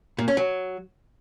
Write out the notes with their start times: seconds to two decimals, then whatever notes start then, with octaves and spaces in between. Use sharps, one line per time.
0.19 A#2
0.28 C#4
0.37 F#3